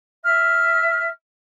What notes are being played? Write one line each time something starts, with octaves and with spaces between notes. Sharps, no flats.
E5 F6